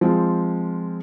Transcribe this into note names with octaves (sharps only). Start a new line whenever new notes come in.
F3 G#3 C4 F4